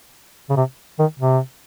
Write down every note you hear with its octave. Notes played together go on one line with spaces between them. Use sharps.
C#3
C3
D#3
C3